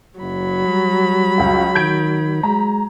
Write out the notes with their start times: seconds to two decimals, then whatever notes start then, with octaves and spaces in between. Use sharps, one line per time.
0.20 F#1 F#3 B5
0.67 G3
1.38 C#2 F#4
1.75 D#3 G6 G#6 D7
2.43 G#3 A#5